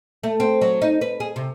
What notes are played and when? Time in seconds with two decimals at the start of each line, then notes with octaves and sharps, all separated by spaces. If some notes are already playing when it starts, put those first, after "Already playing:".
0.23 A3
0.40 C4
0.61 F#3
0.82 D#4
1.01 B4
1.20 G#4
1.36 C3